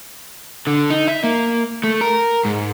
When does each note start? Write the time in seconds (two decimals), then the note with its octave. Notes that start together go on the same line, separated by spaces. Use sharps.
0.67 D3
0.90 D#4
1.08 E5
1.24 A#3
1.84 A3
2.01 A#4
2.45 G#2